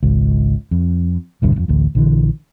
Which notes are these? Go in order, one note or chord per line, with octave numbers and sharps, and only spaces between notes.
G#1 C#2
F2
D#1 C2 G2 D3
A1 F2
D1 A1 D2
A#1 D3 E3